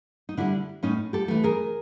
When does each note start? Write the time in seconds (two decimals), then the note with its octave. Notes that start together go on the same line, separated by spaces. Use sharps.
0.29 D#4
0.37 D3 G3 D4 E4
0.83 A2 C#4 D#4
1.13 G4 A4
1.28 E3 A3
1.44 G#4 A#4